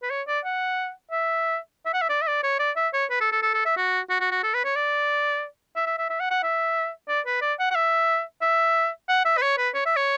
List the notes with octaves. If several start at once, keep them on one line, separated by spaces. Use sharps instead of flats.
B4
C#5
D5
F#5
E5
E5
F#5
E5
D5
E5
D5
C#5
D5
E5
C#5
B4
A4
A4
A4
A4
E5
F#4
F#4
F#4
F#4
A4
B4
C#5
D5
E5
E5
E5
E5
F#5
F#5
E5
D5
B4
D5
F#5
F#5
E5
E5
F#5
E5
B4
C#5
B4
C#5
E5
C#5